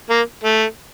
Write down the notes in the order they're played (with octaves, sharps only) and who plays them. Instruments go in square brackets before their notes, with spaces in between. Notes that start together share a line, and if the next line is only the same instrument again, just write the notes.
[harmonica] A#3
A3